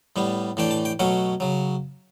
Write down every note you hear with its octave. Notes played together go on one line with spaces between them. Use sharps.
A2 G3 B3
A2 E3 A3 D4 G5
A5
G5
B2 F#3 A3 C#4 F#5
C#3 F#3